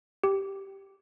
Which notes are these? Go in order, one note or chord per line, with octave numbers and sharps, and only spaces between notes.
G4